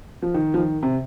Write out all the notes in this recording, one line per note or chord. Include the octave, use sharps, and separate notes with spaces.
F3
D#3
F3
D#3
C3